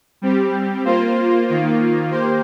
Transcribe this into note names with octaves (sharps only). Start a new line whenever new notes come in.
G3 C4 G4
A#3 F4 C5
D#3 A#3 F4
A#3 G4 C5